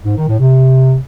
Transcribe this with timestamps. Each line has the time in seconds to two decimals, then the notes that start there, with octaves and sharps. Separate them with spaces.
0.05 G#2
0.16 D#3
0.28 A2
0.39 C3